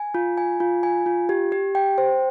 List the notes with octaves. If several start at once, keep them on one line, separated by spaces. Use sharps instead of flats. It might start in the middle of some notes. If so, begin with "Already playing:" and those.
Already playing: G#5
F4
G#5
F4
G#5
F4
G4
G4
G5
C5